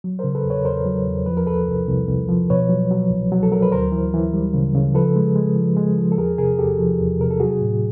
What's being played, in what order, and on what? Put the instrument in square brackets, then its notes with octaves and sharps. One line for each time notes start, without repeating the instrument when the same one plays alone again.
[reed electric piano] F#3
C#3 A#4 C5
A4 B4
E2
B4 C#5
E2 A#4 C5
F#3
E2
F3 B4
A#4
C2 A4 B4
C2
C2
C2
F3
B2 B4 C#5
F#3
F#3
C2
F#3
A4
F#3 A#4
B4
D2 A#4 C5
E3
E3
G3
C#3
C#3
F3 A4 B4
G#3
G#3
F3
G#3
F3
A4
E2 G#4 A#4
C3 G#4 A#4
E2 G4 A4
F3
E2
C3 A#4
A4
F#3 F#4 G#4
A2